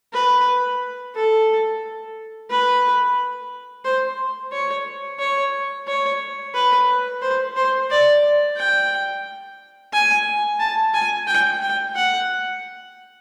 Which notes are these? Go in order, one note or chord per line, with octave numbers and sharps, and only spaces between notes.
B4
A4
B4
C5
C#5
C#5
C#5
B4
C5
C5
D5
G5
G#5
A5
G#5
G5
G5
F#5